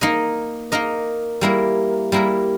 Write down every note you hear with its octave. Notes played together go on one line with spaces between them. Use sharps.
A#3 D#4 A#4 D#5
A#3 D#4 A#4 D#5
G3 A#3 E4 A#4
G3 A#3 E4 A#4